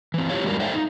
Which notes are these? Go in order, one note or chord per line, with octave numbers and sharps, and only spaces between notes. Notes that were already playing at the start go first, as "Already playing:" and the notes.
E3 C4
E4 F4 G4 C#5 F5
G3 G#3 D4 F#4 A#4 D5
A4 C5 D5 E5 F5 G5
D#4